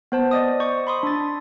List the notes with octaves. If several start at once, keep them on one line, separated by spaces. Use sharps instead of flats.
B3 C5 A5
D5 D#5 D#6
C5 C#6
B5 C6 D#6
D4 A6